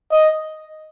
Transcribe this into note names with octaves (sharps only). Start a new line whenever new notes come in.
D#5